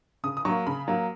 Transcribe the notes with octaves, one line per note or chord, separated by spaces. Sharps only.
C#3 D#6
D#6
F#3 A#3 C#6
C#3 B5
F#3 A#3